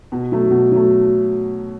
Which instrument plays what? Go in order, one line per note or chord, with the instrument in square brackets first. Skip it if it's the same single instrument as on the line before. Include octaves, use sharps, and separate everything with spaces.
[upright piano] B2
F#3 A3
B2
F#3 A3